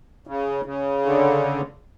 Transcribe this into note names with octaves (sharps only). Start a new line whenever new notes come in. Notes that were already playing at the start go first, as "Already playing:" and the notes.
C#3
C#3
D3